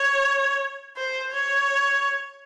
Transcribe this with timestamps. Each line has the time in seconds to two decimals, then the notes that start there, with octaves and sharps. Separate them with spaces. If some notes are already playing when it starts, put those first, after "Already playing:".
Already playing: C#5
0.97 C5
1.32 C#5